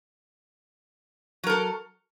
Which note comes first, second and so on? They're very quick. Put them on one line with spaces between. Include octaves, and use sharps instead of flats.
F#3 A#4 A4